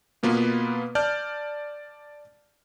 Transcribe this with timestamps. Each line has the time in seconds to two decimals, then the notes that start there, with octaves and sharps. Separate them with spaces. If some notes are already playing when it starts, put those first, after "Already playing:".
0.23 B2 A#3 B3 F4 B4
0.95 D5 A5 F6 G6